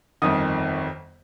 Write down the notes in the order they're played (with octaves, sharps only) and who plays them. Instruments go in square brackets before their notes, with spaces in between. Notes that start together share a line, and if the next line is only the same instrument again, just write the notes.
[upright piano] G1 F2 D#3 D#6